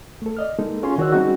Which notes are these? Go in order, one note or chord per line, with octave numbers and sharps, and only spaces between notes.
A3 A4
D5 D#5 F6
G#3 A#3 D#4 A4
C#4 F4 G#4 C#5 G#5 C6
D#3 F#4 C#5 D5 E6 F#6
G3 C4 C#4 D#4 F#4 G#4